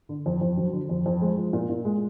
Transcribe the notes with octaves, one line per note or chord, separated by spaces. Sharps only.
D3
F2
F2
F#3
D3
F2
F2
G#3
F3
A#2
A#2
G#3